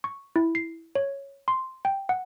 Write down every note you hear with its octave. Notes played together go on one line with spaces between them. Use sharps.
C#6
E4
C7
C#5
C6
G5
F#5